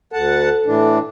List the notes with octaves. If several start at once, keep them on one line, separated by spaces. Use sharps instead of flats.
D2 A4 F#5 A5
A2 E3 D4